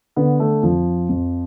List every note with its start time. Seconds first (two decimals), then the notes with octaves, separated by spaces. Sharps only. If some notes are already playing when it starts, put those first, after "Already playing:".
0.16 D3 B3
0.40 A3
0.63 F2 F3
1.09 F2